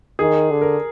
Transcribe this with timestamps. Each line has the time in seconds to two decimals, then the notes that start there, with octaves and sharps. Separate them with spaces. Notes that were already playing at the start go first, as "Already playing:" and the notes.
0.19 D#3 G#4
0.51 D3
0.62 A#4